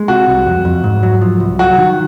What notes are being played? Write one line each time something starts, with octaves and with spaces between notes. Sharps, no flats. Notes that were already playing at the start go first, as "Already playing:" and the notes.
Already playing: G#3
C3 F#4
C2
F2
F2
G#2
F#3
F3
C2
F#3 F#4
D#3